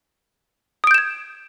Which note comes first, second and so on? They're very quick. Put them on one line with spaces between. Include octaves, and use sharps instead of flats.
D#6 D7 G6 E7 G#6